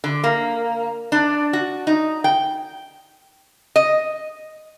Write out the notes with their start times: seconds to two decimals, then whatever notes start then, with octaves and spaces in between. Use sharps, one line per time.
0.04 D3
0.24 A#3
1.12 D4
1.53 F#4
1.87 D#4
2.24 G5
3.76 D#5